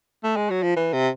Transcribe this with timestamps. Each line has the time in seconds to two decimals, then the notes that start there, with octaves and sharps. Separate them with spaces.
0.24 A3
0.37 G#3
0.50 F#3
0.63 F3
0.76 E3
0.93 C3